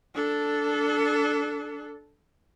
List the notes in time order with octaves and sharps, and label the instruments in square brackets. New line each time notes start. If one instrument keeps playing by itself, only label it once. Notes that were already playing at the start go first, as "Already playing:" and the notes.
[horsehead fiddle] D4 A4